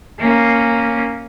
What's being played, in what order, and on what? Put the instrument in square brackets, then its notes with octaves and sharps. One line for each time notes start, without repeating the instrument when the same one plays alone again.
[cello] A#3 C#4